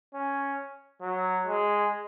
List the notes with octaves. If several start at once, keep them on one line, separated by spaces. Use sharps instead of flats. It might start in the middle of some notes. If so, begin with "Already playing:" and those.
C#4
F#3
G#3